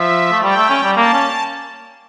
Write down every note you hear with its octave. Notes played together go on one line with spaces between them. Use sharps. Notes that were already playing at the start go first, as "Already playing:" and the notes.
Already playing: F3 E5
A3
G3 G5
A3
C#4
G3
A#3 A5
C#4